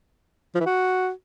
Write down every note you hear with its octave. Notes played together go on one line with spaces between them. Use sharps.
F3
E3
F#4